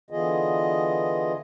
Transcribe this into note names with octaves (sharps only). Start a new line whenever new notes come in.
D3 E3 B3 F4 G#4 D#5